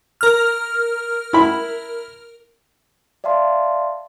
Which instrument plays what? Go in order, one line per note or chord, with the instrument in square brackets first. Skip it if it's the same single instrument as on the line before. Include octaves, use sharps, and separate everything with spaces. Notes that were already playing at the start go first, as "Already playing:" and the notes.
[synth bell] A#4 F6
[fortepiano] E4 B5
[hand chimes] D5 E5 F5 A5 C6